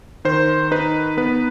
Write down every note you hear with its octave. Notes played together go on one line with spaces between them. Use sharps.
D#3 C5
D#4 B4
B3 B4